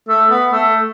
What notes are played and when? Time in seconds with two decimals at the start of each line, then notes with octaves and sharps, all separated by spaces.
0.09 A3
0.30 B3
0.52 A3